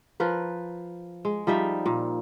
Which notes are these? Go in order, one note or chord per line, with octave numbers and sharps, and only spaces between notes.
F3 A#4 B4
G#3
F3 G3 D#4 E5
A#2